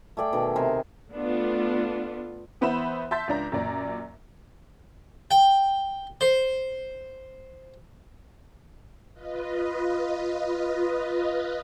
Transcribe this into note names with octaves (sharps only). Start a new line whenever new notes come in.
A3 G#4 D5 G5
B2 D#3
C3 A#4 C5 G#5
A3 B3 D4 F4
E3 B3 C5 E5 B5 E7
E5 A5 C6 G6 A6 B6
C#2 D4 A#5
F#2 A#2 D5 A#5
G5
C5
F4 B4 D#5